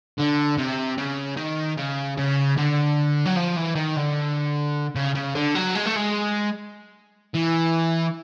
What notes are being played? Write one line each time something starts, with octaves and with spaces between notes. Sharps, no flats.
D3
C3
C#3
D#3
C#3
C#3
D3
F#3
F3
E3
D#3
D3
C#3
C#3
D3
F#3
G#3
A3
G#3
E3